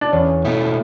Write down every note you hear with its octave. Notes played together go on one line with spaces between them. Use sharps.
D4
E2 C#4
B2 A3 E4